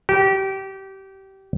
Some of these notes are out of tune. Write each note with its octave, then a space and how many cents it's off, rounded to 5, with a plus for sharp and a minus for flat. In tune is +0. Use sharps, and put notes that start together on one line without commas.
G4 -25